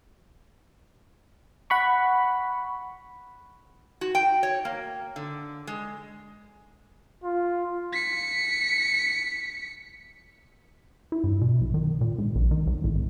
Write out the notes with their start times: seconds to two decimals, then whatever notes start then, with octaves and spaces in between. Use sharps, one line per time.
1.70 F#5 B5 C#6
4.01 F#4
4.15 G5
4.43 C#5
4.65 A#3
5.16 D3
5.67 G#3
7.24 F4
7.93 B6 C#7
11.12 E4
11.24 G2
11.41 B2
11.61 B1
11.74 D#3
12.01 A#2
12.18 G#2
12.35 A#1
12.51 D#3
12.67 C2
12.84 A1
12.96 G#1